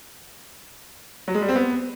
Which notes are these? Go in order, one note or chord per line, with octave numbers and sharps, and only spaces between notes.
F#3
G#3
G3
C4
B3